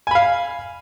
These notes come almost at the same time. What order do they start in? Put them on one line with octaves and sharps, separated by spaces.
G#5 B5 F5